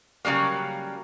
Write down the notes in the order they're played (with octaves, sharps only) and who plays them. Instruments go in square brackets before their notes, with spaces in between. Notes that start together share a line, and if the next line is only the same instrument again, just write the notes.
[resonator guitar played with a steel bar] C#3 F#3 G3 A#3